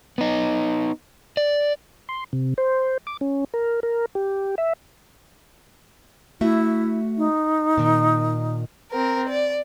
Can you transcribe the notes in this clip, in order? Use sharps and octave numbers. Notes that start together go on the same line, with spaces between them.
B3 D#4
D5
C6
C3
C5
D6
C#4
A#4
A#4
G4
E5
A3 E4 F#4 E5
D#4
A#2 D#3
C4 A#4
D5